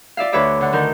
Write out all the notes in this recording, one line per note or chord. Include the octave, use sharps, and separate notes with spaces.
F4 D5 E5 F5
D2 B4 C#5 E5 D6
D3 F#5
D2 D#3 A#4 G6